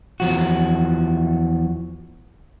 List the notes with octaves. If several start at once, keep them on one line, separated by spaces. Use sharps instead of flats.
E2 F3 F#4